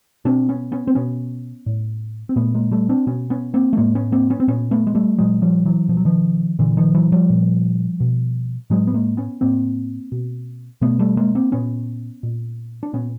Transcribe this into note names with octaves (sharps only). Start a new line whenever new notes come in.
B2 C4 D4
B3 C#4
B3 C#4
C4
B2 B3 C#4
A2
C4
A#2 A3 B3
G#3 A#3
G3 A3
C4 D4
B2 B3 C#4
B3 C#4
A#3 C4
A3
A2 G#3 A#3
B3 C#4
A#3 C4
B3 C#4
C4
A#2 B3 C#4
A3 B3
G#3
G3 A3
A#2 F#3 G#3
F3 G3
E3 F#3
B2 F3
F#3
D#3 F3
A#2 D3 E3
D#3 F3
E3 F#3
F3 G3
A#2
B2
A2 F#3 G#3
B3
G#3 A#3
B3 C#4
A2 A#3 C4
B2
B2 A3 B3
G3 A3
G#3 A#3
A#3 C4
A#2 B3 C#4
A#2
D4
A#2 B3 C#4